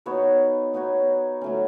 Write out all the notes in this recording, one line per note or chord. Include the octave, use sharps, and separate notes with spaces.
B3 D#4 F#4 C#5
B3 D#4 F#4 C#5
F#3 A3 C#4